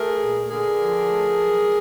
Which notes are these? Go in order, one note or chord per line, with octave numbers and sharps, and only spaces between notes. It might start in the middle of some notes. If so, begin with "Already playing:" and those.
Already playing: A3 G#4 A#4
A#2
D3 G#4 A#4
F3
A3
F#3